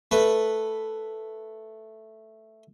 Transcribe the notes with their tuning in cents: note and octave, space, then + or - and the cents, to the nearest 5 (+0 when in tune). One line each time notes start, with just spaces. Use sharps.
A3 +0 B4 +0